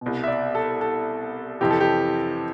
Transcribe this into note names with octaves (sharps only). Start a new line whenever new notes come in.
C2 B2
E5
D5
A4
A4
F2 C3 E3 G4
A4
G4